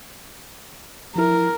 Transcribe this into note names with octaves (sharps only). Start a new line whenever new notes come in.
F3 E4 A#4